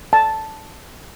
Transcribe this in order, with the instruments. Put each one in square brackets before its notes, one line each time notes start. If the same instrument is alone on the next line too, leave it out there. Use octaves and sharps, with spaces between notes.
[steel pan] A5